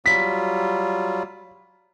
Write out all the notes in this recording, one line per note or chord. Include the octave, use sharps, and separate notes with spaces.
F#3 G3 F4 B6